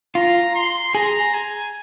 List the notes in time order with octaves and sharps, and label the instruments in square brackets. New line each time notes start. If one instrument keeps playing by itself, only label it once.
[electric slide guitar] F4 [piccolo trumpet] A#5
[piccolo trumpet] C6
[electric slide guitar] G#4 [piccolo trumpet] A#5
[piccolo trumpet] G#5